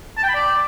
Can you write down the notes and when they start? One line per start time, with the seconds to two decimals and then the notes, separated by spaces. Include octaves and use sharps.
0.17 A5
0.23 G5
0.29 B5
0.35 D5